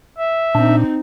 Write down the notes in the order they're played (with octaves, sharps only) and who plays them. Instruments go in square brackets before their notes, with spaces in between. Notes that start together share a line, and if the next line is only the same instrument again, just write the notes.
[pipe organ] E5
[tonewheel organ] A#2 D4 [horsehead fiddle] C4 D#4